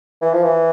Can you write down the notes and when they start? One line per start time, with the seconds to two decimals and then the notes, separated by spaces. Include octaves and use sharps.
0.22 E3
0.33 F3
0.44 E3